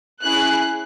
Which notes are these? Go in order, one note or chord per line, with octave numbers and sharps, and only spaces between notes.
C#4 E4 G#4 F#6